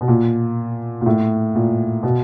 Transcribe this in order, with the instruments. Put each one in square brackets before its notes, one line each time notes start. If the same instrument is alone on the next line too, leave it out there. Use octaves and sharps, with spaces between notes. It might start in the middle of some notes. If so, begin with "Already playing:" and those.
[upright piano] B2
A#2
A#2
A2
A#2
B2